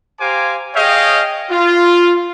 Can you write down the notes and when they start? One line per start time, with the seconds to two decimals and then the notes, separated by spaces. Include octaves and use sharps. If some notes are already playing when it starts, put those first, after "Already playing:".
0.20 G4 C5 F5 G#5 A#5 D6
0.74 G#4 C#5 D#5 F5 G5
1.49 F4